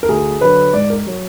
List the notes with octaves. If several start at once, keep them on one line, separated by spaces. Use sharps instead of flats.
A#4
D2 G#4
D3 F#3 B4
G#2 D5
A#4
F#3